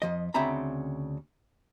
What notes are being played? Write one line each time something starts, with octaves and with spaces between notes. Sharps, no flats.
F2 F3 D#5
D2 C#3 C4 E5 A#5 B5